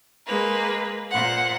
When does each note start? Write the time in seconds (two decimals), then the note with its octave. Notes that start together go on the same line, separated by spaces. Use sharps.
0.26 G#3 A#3 B4
1.12 A#2 C5 F#5